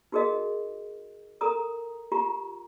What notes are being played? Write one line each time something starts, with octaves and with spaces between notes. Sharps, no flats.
D#4 F#4 G#4 A#4 D#5 F5
A4 A#4 A#5 D#6
F4 G4 A#5